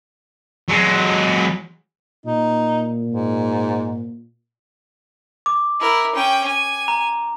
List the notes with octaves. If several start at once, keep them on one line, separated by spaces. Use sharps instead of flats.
F#3 G#3
A#2 D#4
G#2
D6
E4 A#4
C#4 G5
G#5
A#5